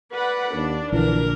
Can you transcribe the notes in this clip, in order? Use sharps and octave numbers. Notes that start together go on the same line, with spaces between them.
B4 D5 F#5 B5
D#2 D4
A#1 D3 E3 A#4